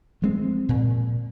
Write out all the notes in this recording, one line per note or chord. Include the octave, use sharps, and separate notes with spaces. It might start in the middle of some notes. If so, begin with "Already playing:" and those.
F3 G#3 C4
A#2